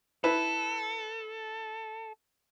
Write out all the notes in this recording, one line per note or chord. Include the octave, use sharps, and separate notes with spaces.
E4 A4 B4